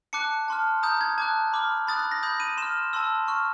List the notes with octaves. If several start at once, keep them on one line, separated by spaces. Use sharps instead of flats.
A5 D6 F#6 C#7
A5 C6 F6
A#5 D#6 G6
G#6
A5 D6 F#6 G#6
B5 D6 F6
B5 D#6 F#6 A6
A6
A#6
B5 D#6 G6
D#7
C6 F6 E7
A5 C6 E6
C#6 F6